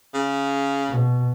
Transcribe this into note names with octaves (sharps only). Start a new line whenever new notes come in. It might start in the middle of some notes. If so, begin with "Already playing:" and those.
C#3
B2